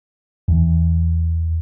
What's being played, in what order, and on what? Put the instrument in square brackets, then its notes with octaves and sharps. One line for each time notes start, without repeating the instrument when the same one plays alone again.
[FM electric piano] E2